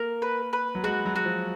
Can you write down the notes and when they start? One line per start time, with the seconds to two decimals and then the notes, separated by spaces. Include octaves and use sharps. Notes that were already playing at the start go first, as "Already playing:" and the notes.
Already playing: A#3 A#4
0.22 B4
0.53 B4
0.75 F#3
0.84 G#3 F#4
1.06 F#3
1.16 F#4
1.25 F3